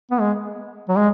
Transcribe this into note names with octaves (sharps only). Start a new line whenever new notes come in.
B3
G#3
F#3
G#3